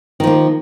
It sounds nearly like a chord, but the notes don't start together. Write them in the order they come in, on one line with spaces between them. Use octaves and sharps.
D#3 F3 A#3